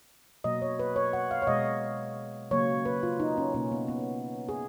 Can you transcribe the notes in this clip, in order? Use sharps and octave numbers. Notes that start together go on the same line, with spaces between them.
B2 F#3 A#3 D#5
C#5
B4
C#5
F#5
F5
C#5
B2 G#3 D#5
C#3 F#3 A#3 C#5
B4
F4
D#4
C#4
B2 A#3 C#4
B3
B3
G#4